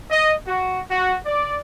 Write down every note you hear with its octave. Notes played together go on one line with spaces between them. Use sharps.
D#5
F#4
F#4
D5